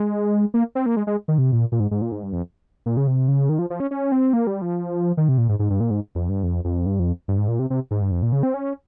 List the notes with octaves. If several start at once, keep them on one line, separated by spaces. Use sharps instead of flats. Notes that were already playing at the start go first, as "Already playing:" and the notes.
Already playing: G#3
A#3
C4
A#3
G#3
G#3
D#3
C3
A#2
A#2
G#2
G#2
A#2
G#2
G2
F2
A#2
C#3
C3
C#3
D#3
F3
F3
C#4
C#4
C4
A#3
G3
F3
D#3
C3
A#2
G#2
G#2
G2
A#2
G#2
F2
G2
F2
F2
G2
F2
G2
G#2
A#2
C3
C3
G#2
G2
F2
A#2
C#3
C4
C#4